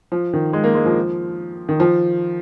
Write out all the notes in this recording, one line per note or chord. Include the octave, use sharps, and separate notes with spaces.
F3
D#3
G#3
A#3
G#3
F3
D#3
F3